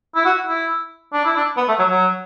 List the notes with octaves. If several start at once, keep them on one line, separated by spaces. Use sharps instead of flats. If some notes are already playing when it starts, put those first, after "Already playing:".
E4
F#4
E4
D4
E4
D4
B3
A3
F#3
F#3